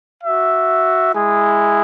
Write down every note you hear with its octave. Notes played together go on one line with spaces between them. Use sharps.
F#4 E5
G#3 E4 G#4